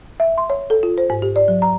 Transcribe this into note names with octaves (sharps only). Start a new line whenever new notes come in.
E5
C6
C#5
A4
F4
C5
G#2
G4
D5
F#3
A#5